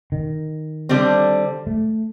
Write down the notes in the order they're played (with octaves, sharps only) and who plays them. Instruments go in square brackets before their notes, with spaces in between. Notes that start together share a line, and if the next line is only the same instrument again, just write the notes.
[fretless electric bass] D#3
[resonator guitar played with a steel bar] D3 G3 C4
[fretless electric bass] A3